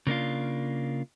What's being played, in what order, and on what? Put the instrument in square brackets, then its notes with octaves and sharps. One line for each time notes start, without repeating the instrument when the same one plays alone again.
[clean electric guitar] C#3 A#3 D4 F4